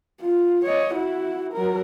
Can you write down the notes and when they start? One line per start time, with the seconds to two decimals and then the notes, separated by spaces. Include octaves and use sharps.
0.21 F4
0.65 C#5 D#5
0.94 E4 F#4
1.53 F#3 A#4